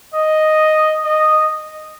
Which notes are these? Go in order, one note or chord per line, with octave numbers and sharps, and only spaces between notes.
D#5
D#5